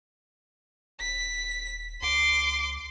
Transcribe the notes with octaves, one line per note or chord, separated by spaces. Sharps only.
D#1 B6
C#2 C6 D6